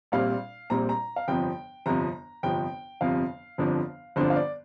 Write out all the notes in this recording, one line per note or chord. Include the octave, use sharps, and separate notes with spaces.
A#1 A#2 G3 C4 F5
A#1 A#2 G3 C4 A#5
A#5
F5
G1 F2 C3 F3 G5
G1 F2 C3 F3 A#5
G1 F2 C3 F3 G5
G1 F2 C3 F3 F5
G1 F2 D3 F3 D4
G1 F2 D3 F3 D4 C5
F5
D5